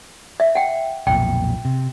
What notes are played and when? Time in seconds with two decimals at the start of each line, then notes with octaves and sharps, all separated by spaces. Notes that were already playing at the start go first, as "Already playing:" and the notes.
0.40 E5
0.55 F#5 G5
1.07 B1 F2 A#2 G5
1.65 C3